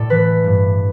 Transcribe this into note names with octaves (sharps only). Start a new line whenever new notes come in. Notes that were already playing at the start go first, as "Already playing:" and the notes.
Already playing: A2 A4 D5
E3 B4
G2